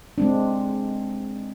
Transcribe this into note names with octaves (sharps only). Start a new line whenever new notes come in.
G#3 C4 D4